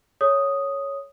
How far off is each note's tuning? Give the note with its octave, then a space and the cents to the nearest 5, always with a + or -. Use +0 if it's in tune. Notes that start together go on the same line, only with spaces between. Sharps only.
A4 -40 C#5 +0 D#6 +0